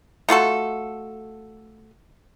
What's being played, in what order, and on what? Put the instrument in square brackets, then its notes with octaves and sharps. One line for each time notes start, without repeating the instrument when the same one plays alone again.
[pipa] A3 F4 F#4 A4